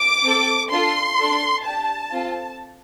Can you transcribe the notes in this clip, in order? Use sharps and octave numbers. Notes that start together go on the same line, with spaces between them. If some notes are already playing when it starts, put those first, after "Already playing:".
Already playing: D6
C4 A4
D4 F4 A4 C6
D4 A4
D4 G4 A5
C4 F4 A4